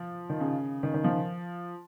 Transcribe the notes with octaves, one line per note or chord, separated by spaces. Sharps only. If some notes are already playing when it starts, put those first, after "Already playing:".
Already playing: F3
D#3
C#3
D#3
D#3
F3